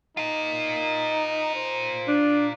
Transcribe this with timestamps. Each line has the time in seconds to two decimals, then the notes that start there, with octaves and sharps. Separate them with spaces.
0.17 D#4 F4 A#4
1.55 C5
2.08 D4